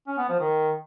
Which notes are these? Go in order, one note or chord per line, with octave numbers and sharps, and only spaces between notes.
C#4
B3
F3
D#3